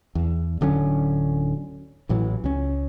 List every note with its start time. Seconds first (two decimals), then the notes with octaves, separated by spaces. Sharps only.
0.15 E2
0.61 D1 D3 F#3 C#4
2.09 A1 A2 E3 F#3
2.44 C#2 C#4